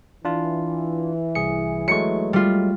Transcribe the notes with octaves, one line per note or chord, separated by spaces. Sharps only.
E3 D4 F4
C2 G#4 C#7
F#3 G#3 A3 C#6 C#7
G3 F4